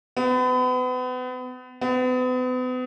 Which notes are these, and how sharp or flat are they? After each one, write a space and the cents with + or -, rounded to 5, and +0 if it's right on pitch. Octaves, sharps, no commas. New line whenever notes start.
B3 +35
B3 +40